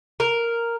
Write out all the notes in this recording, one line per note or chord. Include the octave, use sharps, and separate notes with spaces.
A#4